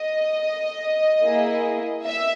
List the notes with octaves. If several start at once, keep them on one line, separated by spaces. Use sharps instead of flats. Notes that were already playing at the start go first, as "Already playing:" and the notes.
Already playing: D#5
A#3 E4 G#4
E5